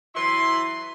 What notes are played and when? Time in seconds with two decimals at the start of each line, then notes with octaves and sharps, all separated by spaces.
0.15 E3 F#3 E4 B4 C6